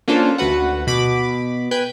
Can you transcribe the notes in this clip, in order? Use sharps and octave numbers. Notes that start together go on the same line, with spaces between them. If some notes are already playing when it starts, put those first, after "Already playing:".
A#3 C#4 D4 F4 A4 C5
D2 F#4 B4 F#5
B2 B5 D6
B4 G5 G#5 G6